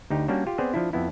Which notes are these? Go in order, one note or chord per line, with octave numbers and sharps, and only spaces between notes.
D2 D#4 G4
G3 A#3 C#4 D4 F#4
F4 G4
B3 C4 G#4 C5 D5
F3 D4 E4
F2 B3 E4